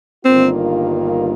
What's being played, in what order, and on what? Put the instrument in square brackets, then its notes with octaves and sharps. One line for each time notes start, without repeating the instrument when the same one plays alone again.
[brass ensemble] G1 G2 D#3 A#3 F4 [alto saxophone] C4